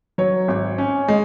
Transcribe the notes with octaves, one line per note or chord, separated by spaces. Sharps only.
F#3 C#5
G#1
C#4
G#3